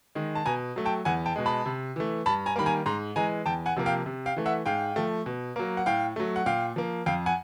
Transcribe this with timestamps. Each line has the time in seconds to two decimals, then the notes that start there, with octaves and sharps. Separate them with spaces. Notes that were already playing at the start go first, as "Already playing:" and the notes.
0.15 D#3 G#3
0.35 A5
0.45 B2 G#5 A#5
0.76 F#3 A3
0.85 G5 A5
1.05 E2 F#5 G#5
1.26 G5 A5
1.36 B2 G#3
1.46 A5 B5
1.66 C3
1.96 E3 A3
2.26 G2 A5 B5
2.46 G#5 A#5
2.56 D#3 G3 A#3 B5
2.66 G#5 A#5
2.86 G#2 A#5 C6
3.16 E3 G#3 G#5 A#5
3.46 E2 G5 A5
3.66 F#5 G#5
3.76 C3 F3 A#3
3.86 F5 G5
4.06 C3
4.26 F5 G5
4.36 E3 A3
4.46 E5 F#5
4.66 G#2 F5 G5
4.96 F3 A3
5.26 B2
5.56 F#3 A#3
5.77 F#5
5.86 A2 F5 G5
6.16 F#3 A3
6.36 F#5
6.46 A#2 F5 G5
6.76 F3 A#3
7.06 F2 F5 G5
7.26 F#5 G#5